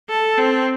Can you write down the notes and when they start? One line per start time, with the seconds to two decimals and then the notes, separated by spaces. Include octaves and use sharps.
0.10 A4
0.38 C4